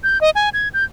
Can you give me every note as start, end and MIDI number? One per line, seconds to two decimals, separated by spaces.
0.04 0.20 91
0.21 0.30 75
0.35 0.49 80
0.53 0.68 92
0.74 0.84 91